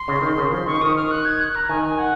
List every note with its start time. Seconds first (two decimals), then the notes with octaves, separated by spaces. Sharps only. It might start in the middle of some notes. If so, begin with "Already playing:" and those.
Already playing: C6
0.08 C#3
0.22 D#3
0.38 C#3
0.52 F3 C6
0.66 D#3 C#6
0.81 D#3 D#6
0.96 F6
1.11 F#6
1.25 G#6
1.41 F#6
1.55 A#5
1.69 D#3 G#5
1.85 G#5
1.99 F#5